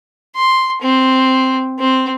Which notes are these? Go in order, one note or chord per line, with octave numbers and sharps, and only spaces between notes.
C6
C4
C4